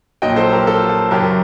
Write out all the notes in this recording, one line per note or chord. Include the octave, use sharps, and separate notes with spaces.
A#1 A#2 F#3 D#5 G5
A4 C5
G4 A#4
A4
A4
F#1 F#2 F#3 G4 A#4